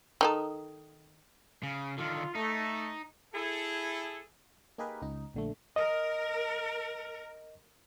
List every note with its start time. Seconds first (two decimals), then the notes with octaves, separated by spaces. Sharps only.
0.21 D#3 D#4 A4
1.63 C#3
1.98 D3 D#3 F4
2.35 A3 D#4
3.33 E4 G#4 A4
4.78 A#3 D#4 G4 G#4 A#4 B4
5.02 C#2 D#4
5.34 A#1 D3 A3
5.76 A#4 D#5